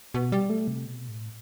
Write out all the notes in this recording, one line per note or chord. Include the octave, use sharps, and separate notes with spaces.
B2
G3
A3
C3
B2
A2